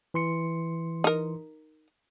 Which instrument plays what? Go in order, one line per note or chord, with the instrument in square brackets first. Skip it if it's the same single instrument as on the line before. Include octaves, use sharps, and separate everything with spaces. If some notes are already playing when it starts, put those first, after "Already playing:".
[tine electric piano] E3 C6 C#7
[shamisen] D#4 A#4